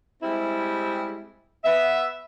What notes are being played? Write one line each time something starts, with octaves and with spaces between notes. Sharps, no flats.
G3 G#3 C4 E4
B3 E5